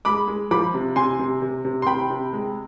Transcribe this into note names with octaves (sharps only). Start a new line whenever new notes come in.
G#3 B5 D6
G#3
F3 B5 D6
C3
C3 G#5 C6
C3
C3
C3
C6
C3 G5 B5
C3
G#3